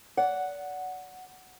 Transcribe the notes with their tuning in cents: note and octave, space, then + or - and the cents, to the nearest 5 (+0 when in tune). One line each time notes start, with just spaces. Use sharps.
D5 -30 F#5 +0